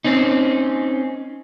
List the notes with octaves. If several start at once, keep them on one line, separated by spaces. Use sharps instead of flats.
C4 C#4 D#4